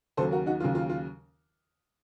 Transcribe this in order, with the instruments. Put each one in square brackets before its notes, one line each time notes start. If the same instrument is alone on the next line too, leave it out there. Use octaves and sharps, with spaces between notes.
[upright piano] D#2 C#3 F#3 A4 C5
F#4 A#4
D#4 F#4
D#2 C#3 F#3 F4
F4
F4